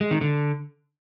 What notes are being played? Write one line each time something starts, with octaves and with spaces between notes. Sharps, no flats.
G#3
D#3
D3